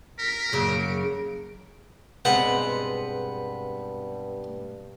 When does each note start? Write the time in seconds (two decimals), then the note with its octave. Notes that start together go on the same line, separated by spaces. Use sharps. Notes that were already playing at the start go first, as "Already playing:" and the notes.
0.19 A#4 B6
0.52 F#2 C#3 F#3 A#3 D7
2.25 G2 B2 G#3 B3 C4 F#5